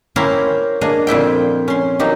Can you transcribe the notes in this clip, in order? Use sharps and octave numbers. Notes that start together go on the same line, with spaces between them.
A#3 C#4 E4 A#4 C5 G5
A#3 D4 G#4 D#5
F2 A#2 E4 G5
C#4 C6
F#3 A#3 D#4 G4